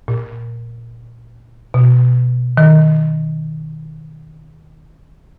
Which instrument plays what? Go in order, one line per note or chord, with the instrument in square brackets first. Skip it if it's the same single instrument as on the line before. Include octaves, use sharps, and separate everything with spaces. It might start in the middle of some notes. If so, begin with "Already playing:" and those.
[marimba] A#2
B2
D#3